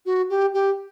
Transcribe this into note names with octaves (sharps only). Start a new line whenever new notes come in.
F#4
G4
G4